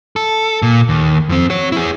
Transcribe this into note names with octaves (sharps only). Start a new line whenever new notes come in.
A4
A#2
D#2
F2 C4
F#4 C#5
E4 G#4